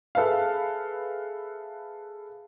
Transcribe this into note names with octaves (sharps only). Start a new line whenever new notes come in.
G#4 A4 B4 E5 F5